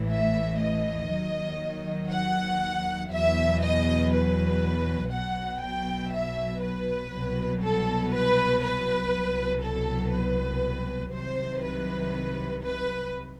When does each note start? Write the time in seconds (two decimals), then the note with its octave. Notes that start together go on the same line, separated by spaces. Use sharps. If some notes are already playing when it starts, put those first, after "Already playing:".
Already playing: A1 A2 E3
0.12 E5
0.62 D#5
1.11 D#2 D#3 F#3
2.11 F#5
3.12 E2 B2 F#3 E5
3.63 D#5
4.11 B4
5.12 B1 B2 F#3 F#5
5.62 G5
6.12 E5
6.62 B4
7.12 C2 B2 F#3
7.63 A4
8.13 B4
8.63 B4
9.13 C2 B2 F#3
9.63 A4
10.12 B4
11.13 C2 C3 D#3 F#3 C5
11.63 B4
12.63 B4